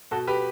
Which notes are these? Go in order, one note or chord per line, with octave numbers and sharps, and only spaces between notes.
B2 F#4 A4
G4 B4